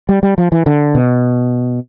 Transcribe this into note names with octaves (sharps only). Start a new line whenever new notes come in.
G3
G3
F3
E3
D3
B2